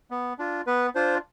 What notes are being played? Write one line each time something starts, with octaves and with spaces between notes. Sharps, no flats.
B3
D4 F4
B3 B4
D4 F4 C5